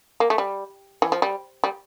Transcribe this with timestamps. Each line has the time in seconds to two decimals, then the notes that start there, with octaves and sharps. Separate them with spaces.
0.20 A#3
0.30 A3
0.38 G3
1.02 E3
1.12 F3
1.22 G3
1.64 G3